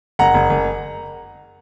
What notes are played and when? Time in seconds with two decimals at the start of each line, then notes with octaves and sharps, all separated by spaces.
0.19 F#1 F#5 A#5
0.34 F#1
0.50 F#1